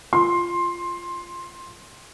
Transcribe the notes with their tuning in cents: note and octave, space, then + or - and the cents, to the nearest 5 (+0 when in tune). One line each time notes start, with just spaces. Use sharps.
F4 -10 C6 +10